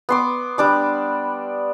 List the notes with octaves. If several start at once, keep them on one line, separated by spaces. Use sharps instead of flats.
B3 C6 D6
G3 D4 D6